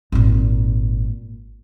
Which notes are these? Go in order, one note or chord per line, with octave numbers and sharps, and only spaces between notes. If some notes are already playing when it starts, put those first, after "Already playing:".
G#1 A#2